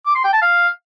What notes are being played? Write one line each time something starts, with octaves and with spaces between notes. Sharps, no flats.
D6
C6
G5
A5
F5